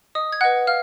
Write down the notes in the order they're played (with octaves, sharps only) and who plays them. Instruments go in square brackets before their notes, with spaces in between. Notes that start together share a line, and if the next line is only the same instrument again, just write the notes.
[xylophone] D#5 D#6
G#6
B4 D#5 F#5 F#6
F5 F6